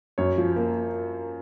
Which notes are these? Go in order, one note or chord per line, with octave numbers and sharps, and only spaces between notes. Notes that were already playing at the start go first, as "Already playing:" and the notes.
F#2 C#5
F3
A#3